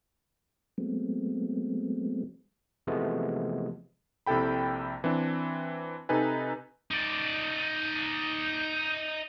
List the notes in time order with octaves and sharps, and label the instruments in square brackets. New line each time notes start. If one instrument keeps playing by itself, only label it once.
[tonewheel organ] F#3 G#3 A3 B3 C4
[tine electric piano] C3 E3 F3 G#3 A3 B3
[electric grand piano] A#1 C3 E4 A4 G5 B5
E3 C4 D4
C3 D#4 A4 B4 G#5
[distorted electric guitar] D#4 D5